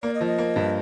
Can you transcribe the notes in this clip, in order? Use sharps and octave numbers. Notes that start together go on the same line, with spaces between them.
A#3 D5
D#5
F3
D#5
A#3
G2